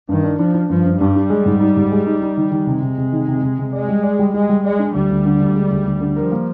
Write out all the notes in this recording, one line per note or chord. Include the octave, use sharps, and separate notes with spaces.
G2 D#3
D4
F3 D4
D4
G2 F3
G2
G2 G3
D4
G#3
G#2
D#4
G#2
G#3
D#4
D#4
D#3
D#3 G#3
C3
C3
C3
D#3
C3
C3
C3
G#3 D5
G3
D5
G3
G3 G#3
G3
G#3 D5
D4
D2 G3
D2
D3
D2
G#3
D2
D2
D3
F3 A#4
A#3